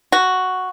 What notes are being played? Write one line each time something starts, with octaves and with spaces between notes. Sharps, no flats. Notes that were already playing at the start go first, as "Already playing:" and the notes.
F#4